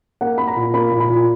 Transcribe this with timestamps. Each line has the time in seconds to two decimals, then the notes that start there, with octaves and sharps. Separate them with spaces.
0.21 A#3 F#5
0.38 A#3 B5
0.47 A#5
0.56 A#2
0.74 A#3 B5
0.91 A#2
1.00 B5
1.09 A#2